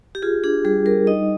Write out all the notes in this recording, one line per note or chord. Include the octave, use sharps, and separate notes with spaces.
G4
F4 G#4
D4 G#4
G3 G#4
G3 A#4
D#4 D#5